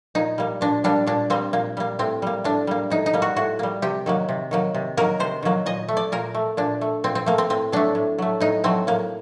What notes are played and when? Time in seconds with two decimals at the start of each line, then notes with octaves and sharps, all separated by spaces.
0.15 A#2 D#4
0.38 G3 A#3
0.61 A#2 D4
0.84 G3 A#3 D4
1.07 A#2 D4
1.30 G3 A#3 C4
1.53 A#2 A#3
1.77 G3 A#3
1.99 A2 C4
2.22 G3 A#3
2.44 A2 D4
2.67 G3 A#3
2.90 A2 D#4
3.06 D#4
3.14 G3 A#3
3.22 F#4
3.36 A2 F#4
3.59 G3 A#3
3.82 C3 G4
4.06 D#3 F#3 A#3
4.29 C3
4.51 D#3 F#3 A#3
4.74 C3
4.97 D#3 F#3 A#3 A#4
5.20 C3 C5
5.43 D#3 F#3 A#3
5.66 A#2 D#5
5.89 A3
5.97 D5
6.12 A#2 A#4
6.35 A3
6.57 A#2 D4
6.81 A3
7.04 A#2 C4
7.15 C4
7.26 A3 A#3
7.38 C4
7.50 A2 C4
7.72 F#3 A3 D4
7.95 A2
8.18 F#3 A3
8.40 A2 D#4
8.64 F#3 A3 C4
8.87 A2 A#3